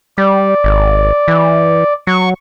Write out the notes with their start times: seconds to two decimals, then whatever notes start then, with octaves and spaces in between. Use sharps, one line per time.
0.18 G3 D5
0.64 G#1
1.28 E3
2.07 F#3 C#6